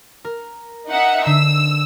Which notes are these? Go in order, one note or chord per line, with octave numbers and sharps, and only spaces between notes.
A#4
D#4 E5 F#5
D3 E6 C7